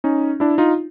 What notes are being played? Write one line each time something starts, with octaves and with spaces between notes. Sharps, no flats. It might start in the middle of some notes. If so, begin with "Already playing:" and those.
C#4 D#4
D4 E4
D#4 F4